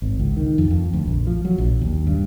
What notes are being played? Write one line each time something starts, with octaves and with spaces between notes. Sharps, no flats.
G#1
C#2
D#3
F2
F2
D2
A#1
F3
F#3
A#1
D#2
G2